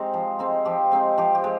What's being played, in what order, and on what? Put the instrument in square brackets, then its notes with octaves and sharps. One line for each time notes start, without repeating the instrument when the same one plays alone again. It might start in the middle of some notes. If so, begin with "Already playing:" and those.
Already playing: [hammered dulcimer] G#3 C4 D#4 G4
F3
G#3 C4 D#4
F3 G4
G#3 C4 D#4
F3 G4
G4
G#3